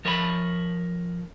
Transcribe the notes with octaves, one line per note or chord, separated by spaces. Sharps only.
F3 A#4 C#5 E5 A#5 B5